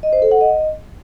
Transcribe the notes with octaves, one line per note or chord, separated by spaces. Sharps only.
D#5
C5
A4
F#5
D#5